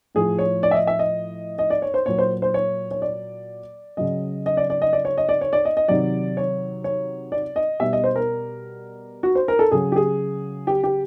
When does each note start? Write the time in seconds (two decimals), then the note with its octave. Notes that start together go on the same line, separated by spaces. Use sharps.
0.15 A2 F3 G#4
0.39 C#5
0.63 D5
0.71 E5
0.74 D#5
0.87 E5
0.99 D#5
1.59 D#5
1.70 D5
1.82 C#5
1.94 C5
2.06 A#2 F#3 C#5
2.18 C5
2.42 C5
2.54 C#5
2.91 C#5
3.02 D5
3.97 C#3 F#3 D#5
4.46 D#5
4.57 D5
4.70 D5
4.82 D#5
4.93 D5
5.05 C#5
5.18 D#5
5.29 D5
5.41 C#5
5.53 D5
5.65 D#5
5.77 D#5
5.88 C3 D#3 F#3 D5
6.37 C#5
6.84 C#5
7.32 D5
7.56 D#5
7.80 B2 G3 E5
7.93 D#5
8.04 C5
8.16 A#4
9.23 F#4
9.35 C5
9.48 A#4
9.59 A4
9.71 C#3 F#3 G#4
9.92 G4
9.96 G#4
10.67 G4
10.84 G4